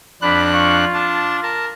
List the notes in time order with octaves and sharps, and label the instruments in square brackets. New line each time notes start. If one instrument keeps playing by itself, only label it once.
[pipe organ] F2 D4 F#6 [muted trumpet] B5
[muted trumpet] F4 [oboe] C#6
[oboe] D4 [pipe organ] A5
[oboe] A#4 [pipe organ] A5